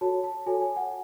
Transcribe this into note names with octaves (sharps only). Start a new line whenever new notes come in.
F#4 A4 C#5 A5
A5
F#4 A4 C#5 G#5
G#5
F#5